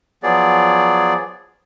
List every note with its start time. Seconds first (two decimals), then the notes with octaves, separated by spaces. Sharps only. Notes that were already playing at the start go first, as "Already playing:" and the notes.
0.23 F3 F#3 B3 G#4 D5